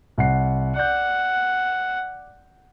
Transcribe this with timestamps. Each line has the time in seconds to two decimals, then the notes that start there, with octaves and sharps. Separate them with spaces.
0.18 C2 F#5 C7
0.76 D5 F#5 G6